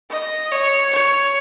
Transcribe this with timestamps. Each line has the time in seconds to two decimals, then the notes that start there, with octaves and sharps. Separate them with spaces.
0.10 D#5
0.51 C#5
0.93 C#5